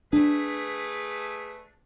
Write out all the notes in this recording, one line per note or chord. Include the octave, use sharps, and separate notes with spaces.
A3 D4 G#4 B4